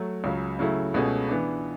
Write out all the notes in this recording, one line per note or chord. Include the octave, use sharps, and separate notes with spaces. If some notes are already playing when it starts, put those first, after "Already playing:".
Already playing: F#3 A3
C#2 C#3 F#3
C#3 F#3 A3 E4
C#2 B2 A3 C#4 G#4
E3 B3 D4